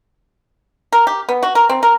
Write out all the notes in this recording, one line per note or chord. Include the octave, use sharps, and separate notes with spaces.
A#4
G4
B3
F#4
A#4
C4
A#4